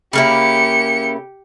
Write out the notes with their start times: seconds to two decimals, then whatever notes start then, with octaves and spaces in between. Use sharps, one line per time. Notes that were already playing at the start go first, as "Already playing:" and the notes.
0.13 C#3 A#3 E4 G4 C#7